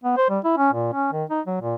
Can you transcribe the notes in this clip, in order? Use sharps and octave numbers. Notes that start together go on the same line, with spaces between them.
B3
C5
G3
E4
C#4
A#2
C#4
D#3
D#4
F#3
A#2